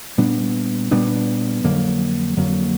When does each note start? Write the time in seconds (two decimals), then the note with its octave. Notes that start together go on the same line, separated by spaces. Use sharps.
0.18 A#2 G3 B3 D4
0.91 A#2 G3 B3 D4
1.64 F2 D3 F#3 A#3
2.37 F2 D3 F#3 A#3